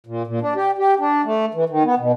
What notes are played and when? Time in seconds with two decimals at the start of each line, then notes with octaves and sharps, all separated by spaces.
0.07 A#2
0.27 A#2
0.41 D4
0.56 G4
0.78 G4
0.99 D4
1.24 A3
1.54 E3
1.69 D#3
1.84 B3
1.98 B2